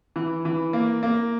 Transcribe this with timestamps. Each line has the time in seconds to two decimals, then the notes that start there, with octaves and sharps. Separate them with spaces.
0.16 E3
0.45 E3
0.73 A#3
1.03 A#3